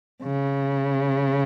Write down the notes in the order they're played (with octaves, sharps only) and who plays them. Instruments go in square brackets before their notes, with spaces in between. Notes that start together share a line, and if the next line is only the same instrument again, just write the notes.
[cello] C#3